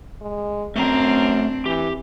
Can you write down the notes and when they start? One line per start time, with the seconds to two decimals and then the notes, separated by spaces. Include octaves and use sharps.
0.22 G#3
0.76 F#2 A3 C4 D4 A#5
1.66 E3 G4